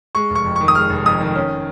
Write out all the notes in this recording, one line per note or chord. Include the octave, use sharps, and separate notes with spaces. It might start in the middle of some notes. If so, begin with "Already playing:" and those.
G#3 C#6
F1
C#6
F2
D#3 C#6
D#6
G#3 F6
F1
F2 D#6
D#3
C#4